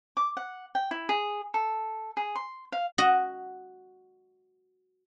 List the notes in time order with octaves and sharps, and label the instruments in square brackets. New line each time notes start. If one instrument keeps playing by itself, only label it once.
[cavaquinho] D6
F#5
G5
E4
G#4
A4
G#4
C6
F5
[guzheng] F#4 D#5